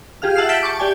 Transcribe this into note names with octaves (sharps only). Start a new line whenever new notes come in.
F4 G4 G#4 F5 F6
E5 F#5 A5 E6 F6 C7
G6 A6 B6 D7 E7
A5 C#6 D6
G4 D5 G5 G#5